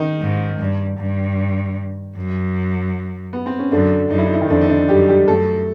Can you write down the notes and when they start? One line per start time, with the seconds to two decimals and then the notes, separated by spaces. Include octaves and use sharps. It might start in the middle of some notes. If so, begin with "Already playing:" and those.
Already playing: D#3 D#4
0.21 G#2
0.59 G2
0.98 G2
2.16 F#2
3.33 B3
3.46 C4
3.59 C#4
3.72 F#2 D3 D4
4.10 F#2 D#4
4.18 E4
4.26 D#4
4.33 E4
4.41 D#3 D#4
4.49 F2 D3 D4
4.61 D#4
4.69 D3 D4
4.88 F#2 G3 G4
5.08 G3 G4
5.28 F#2 A3 A4